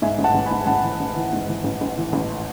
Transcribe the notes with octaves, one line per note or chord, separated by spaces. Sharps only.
G#2 E5 G#5
A1
F#5 A5
A1
G#5 B5
G#2
A1 F#5 A5
E3
A1
E3
G#2
E3
A1
A1
E3
A1